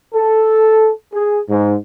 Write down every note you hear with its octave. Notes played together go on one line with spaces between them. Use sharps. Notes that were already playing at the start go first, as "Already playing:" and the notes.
A4
G#4
G#2